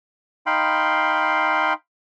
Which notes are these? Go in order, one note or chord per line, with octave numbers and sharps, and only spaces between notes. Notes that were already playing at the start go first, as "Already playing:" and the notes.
D#4 F5 G5 B5 C6